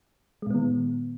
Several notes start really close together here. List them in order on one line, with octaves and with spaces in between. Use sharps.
G#3 A#2 B3 D#3